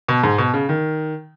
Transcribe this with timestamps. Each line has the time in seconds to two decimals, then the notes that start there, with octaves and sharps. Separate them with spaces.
0.08 B2
0.24 G#2
0.38 B2
0.54 C#3
0.69 D#3